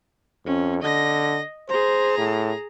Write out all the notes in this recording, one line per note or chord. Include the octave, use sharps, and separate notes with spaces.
F2 C#4
D3 D#5 A#6
G#4 C5 A#5
A2